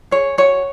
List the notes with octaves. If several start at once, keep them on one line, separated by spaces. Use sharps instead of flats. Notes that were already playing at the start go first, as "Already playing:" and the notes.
G#4 C#5
F#4 C#5